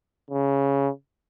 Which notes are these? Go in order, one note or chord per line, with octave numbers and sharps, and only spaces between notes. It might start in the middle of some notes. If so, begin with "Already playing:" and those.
C#3